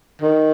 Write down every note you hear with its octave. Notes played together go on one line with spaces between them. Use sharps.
D#3